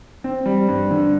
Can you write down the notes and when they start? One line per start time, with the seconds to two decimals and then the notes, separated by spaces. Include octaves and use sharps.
0.24 C4
0.46 G3
0.68 G2
0.91 D3